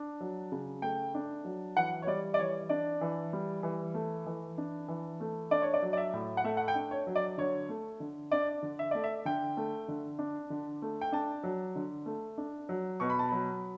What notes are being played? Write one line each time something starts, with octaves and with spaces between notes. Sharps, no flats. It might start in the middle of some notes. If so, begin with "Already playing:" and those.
Already playing: D4
F#3
C#3
A3 G5
D4
F#3
E3 F#5
C#5
G3 D5
D5
E3 C#5
D4 D5
E3
G3
E3
A3
E3
D4
E3
A3
D4 D5
C#5
D5
F#3
D5
E5
A2
F#5
A3 E5
F#5
G5
D4
C#5
F#3
D5
D3 C#5
A3
D3
D4 D5
D3
E5
A3 D5
E5
D3 G5
A3
D3
D4
D3
A3
G5
D4 A5
F#3
D3
A3
D4
F#3
B2 C#6
B5
A5
F#3 B5